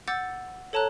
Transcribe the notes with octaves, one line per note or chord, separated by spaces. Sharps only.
F#5 D6 E6 G6 A6
A4 C#5 A5 A#5 F#6